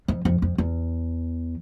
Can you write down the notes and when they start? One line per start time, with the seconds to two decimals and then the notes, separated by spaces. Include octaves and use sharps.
0.08 F2
0.25 F2
0.42 F2
0.58 E2